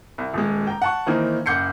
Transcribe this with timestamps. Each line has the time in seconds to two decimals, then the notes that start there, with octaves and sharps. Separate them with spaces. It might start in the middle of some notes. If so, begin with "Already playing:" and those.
0.18 C2
0.33 D#1 G#3
0.67 G5 A#5
0.82 F#5 A5 C#6
1.07 D#3 E3 A#3 C4 D#4
1.46 F#1 F#5 D6 G6 C7 C#7